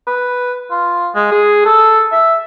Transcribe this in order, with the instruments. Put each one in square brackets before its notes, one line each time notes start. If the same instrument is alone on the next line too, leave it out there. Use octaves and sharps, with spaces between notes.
[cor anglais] B4
F4
G#3
G#4
A4
E5